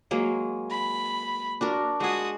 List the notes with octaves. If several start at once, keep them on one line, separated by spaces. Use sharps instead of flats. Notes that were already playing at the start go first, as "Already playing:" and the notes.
F#3 G#3 A#3
B5
D4 F#4 A#4
G#3 F#4 G#4 D#6